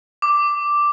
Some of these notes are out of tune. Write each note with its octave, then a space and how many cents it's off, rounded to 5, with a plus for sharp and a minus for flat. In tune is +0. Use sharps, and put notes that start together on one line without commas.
D6 +0